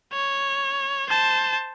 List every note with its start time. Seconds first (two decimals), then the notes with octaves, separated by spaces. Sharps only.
0.13 C#5
1.09 C5 A5